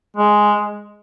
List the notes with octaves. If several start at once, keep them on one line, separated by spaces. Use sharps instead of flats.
G#3